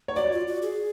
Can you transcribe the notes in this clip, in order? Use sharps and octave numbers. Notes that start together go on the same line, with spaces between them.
C#5
F#4 D5
F4
F#4
G#4